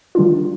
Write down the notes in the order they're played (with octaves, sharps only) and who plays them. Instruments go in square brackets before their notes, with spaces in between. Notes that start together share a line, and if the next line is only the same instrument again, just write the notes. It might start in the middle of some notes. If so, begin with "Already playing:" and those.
[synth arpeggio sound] D#3 G3 D4 F4